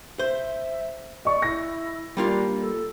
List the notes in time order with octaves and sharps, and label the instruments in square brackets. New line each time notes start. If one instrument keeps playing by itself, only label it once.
[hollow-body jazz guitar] C5 [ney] E5
[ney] D5 [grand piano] D#5 C#6
[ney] E4 [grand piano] A#6
[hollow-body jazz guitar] G3 A#3 F4 [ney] D4
[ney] A4